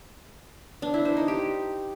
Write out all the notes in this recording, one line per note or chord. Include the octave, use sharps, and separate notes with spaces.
D4
E4
C5
D#4
G4